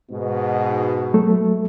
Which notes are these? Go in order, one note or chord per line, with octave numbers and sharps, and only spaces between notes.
G#2 B2
F#3 A3 A4